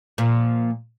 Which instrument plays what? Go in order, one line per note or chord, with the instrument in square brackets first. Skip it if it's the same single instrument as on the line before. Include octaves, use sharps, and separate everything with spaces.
[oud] A#2 F3